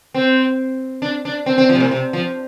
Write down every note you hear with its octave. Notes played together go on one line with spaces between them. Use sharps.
C4
D4
D4
C4
C4
F3
C3
A2
C3
F3